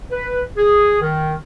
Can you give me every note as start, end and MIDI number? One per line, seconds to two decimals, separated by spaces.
0.12 0.41 71
0.57 1.00 68
1.01 1.34 51